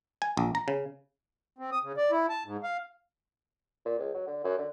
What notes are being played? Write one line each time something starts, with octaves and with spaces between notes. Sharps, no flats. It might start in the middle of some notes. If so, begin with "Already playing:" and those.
G#5
A#1
A#5
C#3
C4
D#6
C#3
D5
E4
A5
G#2
F5
A#2
C#2
F#3
D3
F#2
D3